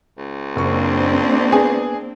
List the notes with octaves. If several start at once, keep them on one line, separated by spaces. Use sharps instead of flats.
C#2
F#1 A#3 C4 D4 C#6
B3 G#4